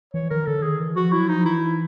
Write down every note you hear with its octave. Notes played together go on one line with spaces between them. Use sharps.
E3 C#5
D#3 A#4
D3 A4
D#3 G#4
E3
F3 F#4
F#3 E4
F3 D#4
E3 E4